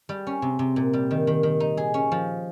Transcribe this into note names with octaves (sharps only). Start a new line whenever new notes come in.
G3
C#4
C3
C3
A#2
G3
D#3
D#3
D#3
D#4
G#4
C#4
F3